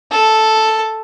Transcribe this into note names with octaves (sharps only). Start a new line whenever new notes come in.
A4